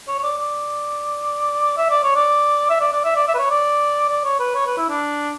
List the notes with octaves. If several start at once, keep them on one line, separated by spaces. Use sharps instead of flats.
C#5
C#5
D5
D5
E5
D5
C#5
D5
E5
D5
D5
E5
D5
E5
B4
C#5
D5
D5
C#5
B4
C#5
B4
E4
D4